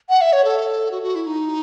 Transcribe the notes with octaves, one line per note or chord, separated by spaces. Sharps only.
F#5
E5
C#5
A4
F#4
F#4
E4
D#4